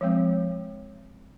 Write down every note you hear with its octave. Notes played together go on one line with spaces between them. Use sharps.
F3 G#3 C4